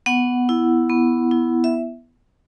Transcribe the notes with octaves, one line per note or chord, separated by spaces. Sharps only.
B3 F#5
E4
B3
E4
E5